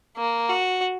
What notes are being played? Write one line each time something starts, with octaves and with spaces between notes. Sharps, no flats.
A#3
F#4